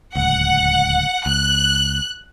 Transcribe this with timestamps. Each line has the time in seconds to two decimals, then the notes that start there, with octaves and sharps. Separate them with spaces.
0.16 D1 G1 C#2 F#5
1.26 C#2 F#6